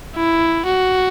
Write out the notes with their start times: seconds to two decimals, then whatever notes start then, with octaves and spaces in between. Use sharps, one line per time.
0.15 E4
0.66 F#4